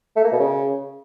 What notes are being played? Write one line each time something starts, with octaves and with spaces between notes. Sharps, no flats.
A3
A#3
B2
C#3